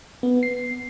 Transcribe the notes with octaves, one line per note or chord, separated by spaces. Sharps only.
B3
C7